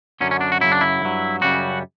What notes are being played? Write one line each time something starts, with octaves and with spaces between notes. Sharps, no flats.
F#2 D3 F#3 C#4
C#4
D4
F#4
F#2 C#3 F#3 E4
D4
E4
G2 F#3
F#2 C#3 G3 F#4